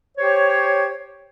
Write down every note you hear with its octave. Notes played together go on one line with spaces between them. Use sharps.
G4 C5 C#5